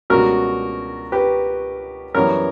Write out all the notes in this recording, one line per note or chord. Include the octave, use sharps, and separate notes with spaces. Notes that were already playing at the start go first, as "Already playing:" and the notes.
C#2 B2 G3 A#3 F#4 A#4
G4 B4
F#2 E3 G3 B3 A#4 C#5